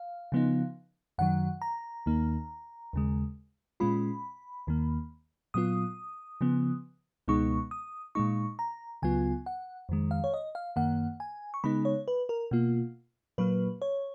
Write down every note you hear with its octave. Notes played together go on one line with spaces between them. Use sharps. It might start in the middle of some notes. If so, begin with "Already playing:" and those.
Already playing: F5
C#3 F3 B3 D#4
F#2 D#3 F#3 F#5
A#5
D#2 D#3 A#3 D#4
D#2 C#3 G#3
A#2 G#3 C#4 F4 B5
D#2 D#3 A#3
A#2 F#3 B3 F4 D#6
C#3 F3 B3
C#2 B2 G#3 B3 D#4 C#6
D#6
A#2 G#3 D#4 C#6
A#5
C#2 C#3 F#3 B3 F4 G#5
F#5
F2 D#3 G#3
F5
C#5
D#5
F5
F#2 D#3 A#3 F#5
G#5
C#6
C#3 G#3 B3 D#4 B5
C#5
B4
A#4
B2 A#3 F4
A#2 F#3 A#3 B4
C#5